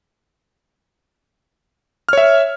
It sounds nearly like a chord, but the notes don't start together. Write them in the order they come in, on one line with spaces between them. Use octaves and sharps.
F6 C#5 E5